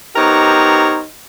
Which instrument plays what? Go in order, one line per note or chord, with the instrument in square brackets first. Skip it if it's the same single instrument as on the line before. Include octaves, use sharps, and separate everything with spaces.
[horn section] B3 D#4 G4 A#4 C5 C#5